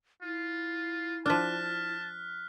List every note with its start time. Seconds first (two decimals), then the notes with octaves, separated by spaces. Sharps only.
0.23 E4 F4
1.26 F3 D4 A5 F6 F#6 B6